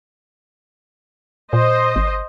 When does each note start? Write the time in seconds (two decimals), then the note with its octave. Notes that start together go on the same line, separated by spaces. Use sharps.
1.53 A#2 C5 D#5
1.96 G#1